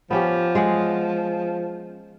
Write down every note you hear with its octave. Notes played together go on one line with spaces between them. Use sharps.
F3 B3 C#4 G4
G#3 G#4 F#5